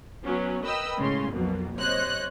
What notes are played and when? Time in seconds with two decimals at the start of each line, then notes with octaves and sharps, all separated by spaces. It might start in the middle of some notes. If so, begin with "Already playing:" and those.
0.24 F#3 B3 C#4
0.64 A#4 B4 D#5 G5 B5 E6
0.99 A2 C#3 G#3 C#4 C6
1.32 B1 F2 B2 F#3 A#3
1.77 C3 C5 C#5 D#5 F#6